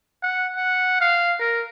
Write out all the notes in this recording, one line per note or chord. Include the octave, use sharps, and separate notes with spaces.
F#5
F#5
F5
A#4